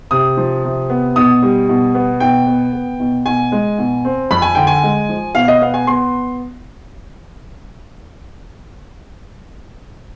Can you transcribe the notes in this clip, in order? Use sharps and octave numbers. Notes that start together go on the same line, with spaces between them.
C3 D#6
F3
C3
B3
B2 D#6
G3
B2
B3
B2 G5
B3
B3
B2
B2 G#5
G#3
B2
C4
F2 B5
G#5
D3 G5
G#5
G#3
F3
B2 F5
D#5
B3 F5
G#5
B3 C6